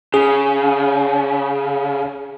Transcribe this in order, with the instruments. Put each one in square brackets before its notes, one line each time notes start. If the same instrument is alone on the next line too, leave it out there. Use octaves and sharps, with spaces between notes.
[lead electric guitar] C#3 [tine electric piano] G#4